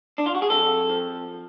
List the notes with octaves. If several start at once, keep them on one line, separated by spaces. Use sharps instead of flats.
D4
F4
F#4
G#4
F2 A4
F3